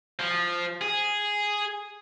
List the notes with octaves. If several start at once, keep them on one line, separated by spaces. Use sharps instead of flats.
F3
G#4